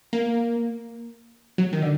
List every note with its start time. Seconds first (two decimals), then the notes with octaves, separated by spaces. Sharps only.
0.13 A#3
1.58 F#3
1.73 D#3
1.82 D3